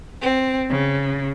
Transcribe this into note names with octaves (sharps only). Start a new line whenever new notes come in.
C4
C#3